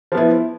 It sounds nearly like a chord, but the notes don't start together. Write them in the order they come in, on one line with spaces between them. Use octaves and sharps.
F3 B3 E4